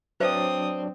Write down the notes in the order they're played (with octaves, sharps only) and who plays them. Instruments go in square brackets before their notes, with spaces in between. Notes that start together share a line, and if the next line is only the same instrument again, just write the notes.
[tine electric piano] F#3 D4 D5 [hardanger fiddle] C4 [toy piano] B4 C5 E5 [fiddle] D#6